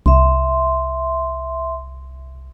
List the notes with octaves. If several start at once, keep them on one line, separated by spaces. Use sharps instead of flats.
C2 E5 C6